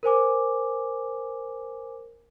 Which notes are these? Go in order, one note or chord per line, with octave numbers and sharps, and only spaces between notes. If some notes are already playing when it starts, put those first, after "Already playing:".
A#4 C5 G#5 D6